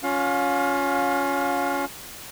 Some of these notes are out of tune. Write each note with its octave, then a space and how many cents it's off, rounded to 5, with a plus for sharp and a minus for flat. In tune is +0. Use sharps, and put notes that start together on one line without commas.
C#4 +15 F4 +35 F5 +30